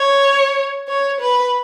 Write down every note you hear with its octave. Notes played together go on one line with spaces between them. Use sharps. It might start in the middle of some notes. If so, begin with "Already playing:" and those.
Already playing: C#5
C#5
B4